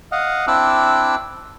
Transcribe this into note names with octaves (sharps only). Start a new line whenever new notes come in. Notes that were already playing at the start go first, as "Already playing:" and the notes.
D#5 F5 F#5
C4 D4 E4 D6 E6 F#6